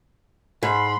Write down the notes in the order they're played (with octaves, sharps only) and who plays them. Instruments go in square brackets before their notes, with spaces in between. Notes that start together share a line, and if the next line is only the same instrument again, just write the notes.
[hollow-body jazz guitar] G#2 [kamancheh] B5 C6